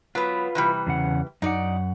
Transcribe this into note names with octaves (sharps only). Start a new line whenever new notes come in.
F#3 B3 F4 B4
C3 E3 G3
E2 C#3 F#5
F#2 D#4 D5 F#5